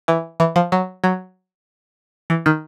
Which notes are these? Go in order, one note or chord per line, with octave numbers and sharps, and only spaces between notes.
E3
E3
F3
F#3
F#3
E3
D#3